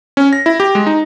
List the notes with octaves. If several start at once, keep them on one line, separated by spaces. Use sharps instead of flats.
C#4
A#6
E4
G4
G#3
D#4